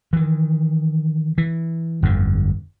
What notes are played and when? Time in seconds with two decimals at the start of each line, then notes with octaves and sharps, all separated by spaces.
0.13 D#3 E3
1.38 E3
2.03 G1 F2 D3